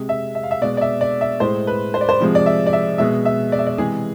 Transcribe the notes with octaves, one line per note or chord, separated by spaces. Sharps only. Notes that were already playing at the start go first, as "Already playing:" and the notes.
Already playing: C3 G#3
E5
E5
F5
E5
B2 G#3 D5
D5
E5
D5
E5
A2 G#3 C5
B4
C5
D5
C5
C3 F3 G#3
D5
E5
D5
E5
B2 G#3 E5
E5
D5
E5
D5
C3 E3 G#3 G#4